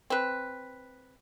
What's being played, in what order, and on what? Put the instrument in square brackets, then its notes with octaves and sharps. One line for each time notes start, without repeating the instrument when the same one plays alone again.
[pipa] C4 B4